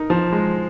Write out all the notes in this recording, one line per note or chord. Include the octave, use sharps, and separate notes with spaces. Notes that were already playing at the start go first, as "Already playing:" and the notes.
Already playing: D#4 A#4
F3
G#3